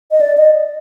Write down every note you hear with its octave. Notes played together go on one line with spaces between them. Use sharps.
D#5
D5
D#5